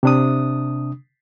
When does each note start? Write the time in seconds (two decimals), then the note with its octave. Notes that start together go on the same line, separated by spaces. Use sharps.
0.03 C3 D4 D#6